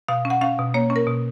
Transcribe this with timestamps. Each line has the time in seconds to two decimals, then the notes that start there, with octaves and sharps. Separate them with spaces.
0.08 B2 F5
0.25 C#4
0.30 F#5
0.41 C#4 F5
0.59 B2
0.74 A#3 C#5
0.90 C#4
0.96 A#4
1.07 B2